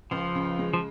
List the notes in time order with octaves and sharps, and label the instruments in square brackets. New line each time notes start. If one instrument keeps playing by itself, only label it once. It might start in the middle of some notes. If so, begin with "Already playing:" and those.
[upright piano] C#2 [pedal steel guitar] F3
[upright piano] C#3
G#3
[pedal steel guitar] F3